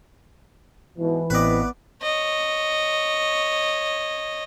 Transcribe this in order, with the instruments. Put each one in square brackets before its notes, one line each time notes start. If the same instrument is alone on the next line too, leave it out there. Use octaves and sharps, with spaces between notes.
[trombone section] G#2 B2 [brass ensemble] E3
[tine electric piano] A1 C4 D#5 [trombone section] B3 [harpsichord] B4 D5
[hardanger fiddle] C#5 D#5